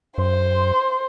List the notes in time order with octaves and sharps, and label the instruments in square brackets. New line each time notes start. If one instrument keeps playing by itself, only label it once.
[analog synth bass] F#2 [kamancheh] C5